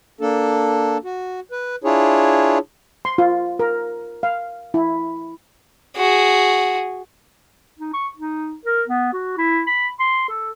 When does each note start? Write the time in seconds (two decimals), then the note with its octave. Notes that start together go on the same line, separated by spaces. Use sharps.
0.21 A#3 D4 A4
1.04 F#4
1.52 B4
1.84 D4 E4 F4 G#4 C#5
3.05 C6
3.18 F4
3.59 A#4
4.23 F5
4.74 E4
5.97 F#4 G#4
7.79 D#4
7.94 C#6
8.17 D#4
8.66 A#4
8.88 B3
9.13 F#4
9.38 E4
9.67 B5
9.99 C6
10.29 A4